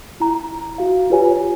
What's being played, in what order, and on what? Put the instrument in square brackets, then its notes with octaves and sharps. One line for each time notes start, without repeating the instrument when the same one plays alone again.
[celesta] E4 A#5
F#4 F5
F4 G4 B4 C#5 G#5